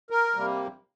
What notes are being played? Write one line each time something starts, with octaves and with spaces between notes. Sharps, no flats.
A#4
C3 G3 A#3